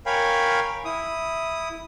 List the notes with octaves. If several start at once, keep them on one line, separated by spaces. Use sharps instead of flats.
A#4 C#5 F5 G5 G#5 B5
E4 D#6